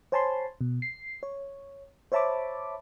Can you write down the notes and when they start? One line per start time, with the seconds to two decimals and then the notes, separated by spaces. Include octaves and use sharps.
0.12 C5 C#5 G#5 A5 B5 C6
0.61 B2
0.82 C7
1.23 C#5
2.12 C5 C#5 E5 A5 B5 D6